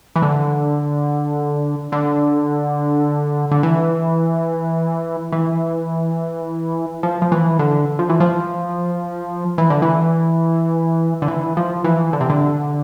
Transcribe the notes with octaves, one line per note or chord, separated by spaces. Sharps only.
E3
D3
D3
D3
E3
E3
F3
F3
E3
D3
F3
E3
F3
E3
D3
E3
D3
E3
F3
E3
D3
C3
D3